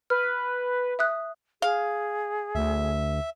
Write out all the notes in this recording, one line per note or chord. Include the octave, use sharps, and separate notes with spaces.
B4 F6
E5 D#6 F#6
G#4 F5
D2 E5